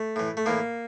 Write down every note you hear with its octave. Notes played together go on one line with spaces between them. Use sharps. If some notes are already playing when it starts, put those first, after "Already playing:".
Already playing: A3
A2 E3
A3
A2 E3 A#3